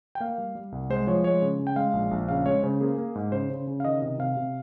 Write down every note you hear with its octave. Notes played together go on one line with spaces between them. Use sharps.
G5
A#3 F5
G3
G3
C2
G#3 C5
F3 C#5
G#3 C#5
C#3
C#3
G5
G#3 F5
A#1
A#1
C#3 F5
G#3 C#5
C#3 C5
A#3 G#4
A#3
G#2
C#3 C5
C#3
C#3
F5
D#3 D#5
C3 D#5
C3 F5
C3